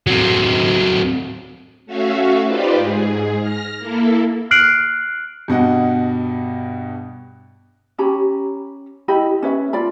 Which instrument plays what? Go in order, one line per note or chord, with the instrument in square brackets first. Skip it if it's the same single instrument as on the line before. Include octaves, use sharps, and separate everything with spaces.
[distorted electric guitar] F#3 C4
[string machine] A3 C#4 F#4 E5 F5
D#4 F4 G4 B4 C5 D5
G#2 G#4
F6 A#6
A#3 E4 A4
[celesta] F6 F#6 C7 D7 F#7
[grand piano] G2 B2 D#5 F#5
[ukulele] C#4 G4 A#5 B5
E4 G4 D#5 B5
C#4 B4 E5 B5
F4 D5 B5